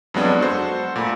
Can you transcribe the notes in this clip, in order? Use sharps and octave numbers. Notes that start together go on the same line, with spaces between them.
F2 F3 F#3 G#3 B3 D4
F#4 A4 C5
A#2 A3 B5